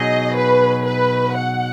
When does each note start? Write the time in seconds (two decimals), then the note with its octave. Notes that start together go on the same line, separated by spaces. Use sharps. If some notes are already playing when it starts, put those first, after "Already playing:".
Already playing: B2 F#3 D#4 G#4 D#5
0.35 B4
0.85 B4
1.36 F#5